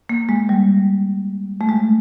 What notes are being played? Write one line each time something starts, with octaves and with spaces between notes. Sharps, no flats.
A#3
G#3
G3
A3
G#3